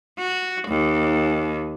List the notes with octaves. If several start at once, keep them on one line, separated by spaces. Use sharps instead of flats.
F#4
D#2